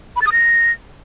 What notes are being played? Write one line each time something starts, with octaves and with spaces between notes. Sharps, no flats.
B5
A6
D#6
A#6